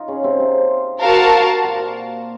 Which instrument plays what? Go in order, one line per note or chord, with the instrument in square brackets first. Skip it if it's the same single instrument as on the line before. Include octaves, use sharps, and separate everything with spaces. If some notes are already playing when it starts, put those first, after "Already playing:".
Already playing: [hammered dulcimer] D#4 F4
C#3 C#4
C3 C4
C3 C4
[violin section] F#4 A#4 F5 A5
[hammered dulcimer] A#2 A#3